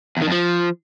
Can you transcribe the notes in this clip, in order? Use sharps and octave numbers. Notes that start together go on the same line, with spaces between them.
E2
D#3
F2
F3